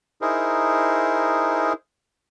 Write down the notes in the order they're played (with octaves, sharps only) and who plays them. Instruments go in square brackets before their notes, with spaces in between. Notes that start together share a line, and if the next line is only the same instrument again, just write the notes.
[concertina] D#4 E4 G#4 A#4 C5